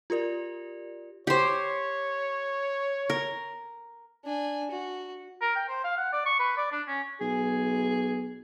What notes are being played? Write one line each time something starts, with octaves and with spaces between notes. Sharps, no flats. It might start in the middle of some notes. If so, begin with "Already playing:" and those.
F4 G4 A#4 D5
G4 C5 C#5
A#4
D4 G#5
F#4
A#4
G5
C5
F5
F#5
D5
C#6
B4
D5
D4
C#4
B1 G#4